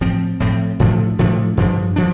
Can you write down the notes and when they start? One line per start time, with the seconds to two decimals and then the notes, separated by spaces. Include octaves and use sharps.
0.01 A2 F3 C4
0.40 A2 F3 C4
0.80 A2 F3 A3 D4
1.19 A2 F3 A3 D4
1.57 G2 F3 D4
1.96 F3 D4